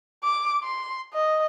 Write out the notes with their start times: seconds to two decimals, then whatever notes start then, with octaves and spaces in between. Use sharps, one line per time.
0.23 D6
0.63 C6
1.14 D#5